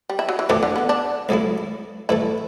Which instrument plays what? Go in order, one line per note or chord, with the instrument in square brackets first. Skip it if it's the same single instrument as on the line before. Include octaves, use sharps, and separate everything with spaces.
[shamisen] G3
E4
F#3
E3
[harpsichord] E2 B2 A3 D4 G4 [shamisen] E3
[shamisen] D3
B3
D4
[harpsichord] C#2 B2 F#3 A3 E4
[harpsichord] A2 E3 A3 [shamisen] E4